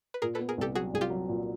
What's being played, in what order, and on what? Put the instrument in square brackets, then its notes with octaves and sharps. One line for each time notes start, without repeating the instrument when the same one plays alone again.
[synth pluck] B4
[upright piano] A#2 [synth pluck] G#4 A#4
[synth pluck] A4 B4
[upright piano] B3
[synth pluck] G#4 A#4
[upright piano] C2 [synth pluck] G4 A4
[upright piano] F#3 [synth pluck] F#4 G#4
[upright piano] C2 [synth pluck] G#4
[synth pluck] F4 G4
[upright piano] F#3
A#2